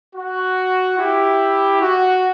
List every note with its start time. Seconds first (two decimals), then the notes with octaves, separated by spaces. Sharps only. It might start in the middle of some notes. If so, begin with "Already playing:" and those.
0.16 F#4
0.98 E4 G4
1.81 F#4